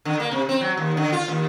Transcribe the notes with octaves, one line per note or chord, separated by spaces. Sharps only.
D3
A#3
C3
C4
F#3
D#2
D3
F4
D#2